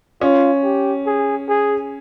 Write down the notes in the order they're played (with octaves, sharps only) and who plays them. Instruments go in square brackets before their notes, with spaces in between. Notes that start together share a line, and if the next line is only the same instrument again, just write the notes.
[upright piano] C#4 [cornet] F4
[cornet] G4
G#4
G#4